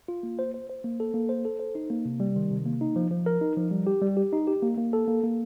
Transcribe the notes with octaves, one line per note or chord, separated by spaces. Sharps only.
F4
A#3
C5
C5
C5
A#3
A4
A#3
C5
A4
C5
D#4
A#3
C3
G3
D#3
C3
A#3
D#4
F3
F3
A#4
D#4
F3
G3
G4
G3
G4
D#4
G4
A#3
A#3
A4
A#3
A#3